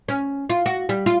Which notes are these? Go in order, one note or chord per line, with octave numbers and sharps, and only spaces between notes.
C#4
F4
F#4
G3
F4